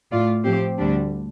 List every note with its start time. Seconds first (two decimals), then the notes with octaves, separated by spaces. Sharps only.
0.11 A2 A3 F4 D5
0.44 A2 F3 C4 G4 C5
0.78 D2 D3 G3 D4